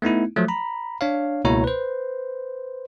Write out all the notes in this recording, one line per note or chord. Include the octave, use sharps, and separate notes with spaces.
A3 B3 D#4 E4
F3 F#3 A3
A#5 B5
D4 C#5 F5
C#2 B2 A#3 E4 C#5 A#5
B4 C5